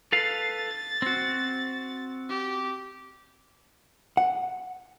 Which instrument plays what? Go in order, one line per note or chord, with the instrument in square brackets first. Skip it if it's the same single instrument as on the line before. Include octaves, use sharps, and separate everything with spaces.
[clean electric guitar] A4 B4 F5 [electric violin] A6
[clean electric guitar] C4 F#4
[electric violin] G4
[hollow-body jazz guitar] F#5